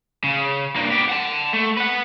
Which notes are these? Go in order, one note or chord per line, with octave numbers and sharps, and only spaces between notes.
C#3
G2 A#3
B3 G4
F#5 A5
A3
B4 F#5